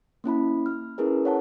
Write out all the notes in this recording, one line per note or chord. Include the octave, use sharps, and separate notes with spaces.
A#3 C#4 E4 B5
F6
C#4 E4 G#4 A#4 B4
C#5 F#5 A5